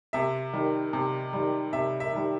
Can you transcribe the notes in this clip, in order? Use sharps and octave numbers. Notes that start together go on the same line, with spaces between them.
C3 E5
D#3 G3
C3
D#3 G3
C3 E5
E5
D#3 G3